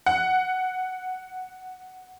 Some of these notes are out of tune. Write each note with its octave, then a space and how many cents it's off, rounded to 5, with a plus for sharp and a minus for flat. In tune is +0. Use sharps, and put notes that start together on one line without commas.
F#5 +0